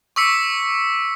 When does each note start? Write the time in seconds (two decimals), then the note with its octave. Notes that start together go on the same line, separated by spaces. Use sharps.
0.16 C#6 D6 E6 B6 C#7